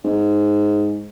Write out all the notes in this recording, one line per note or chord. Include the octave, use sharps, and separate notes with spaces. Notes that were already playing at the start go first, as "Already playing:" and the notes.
G#2